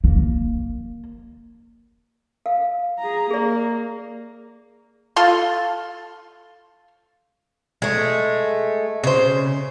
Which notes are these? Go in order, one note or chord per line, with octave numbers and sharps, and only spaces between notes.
A#3
F5
G#4 A#5
A#3 G#4 D5
F4 A4 C6
G#3 A3
C#3 C5